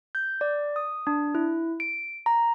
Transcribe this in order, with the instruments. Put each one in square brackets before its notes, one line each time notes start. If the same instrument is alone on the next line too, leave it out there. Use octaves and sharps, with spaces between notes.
[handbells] G6
D5
D#6
D4
E4
D7
A#5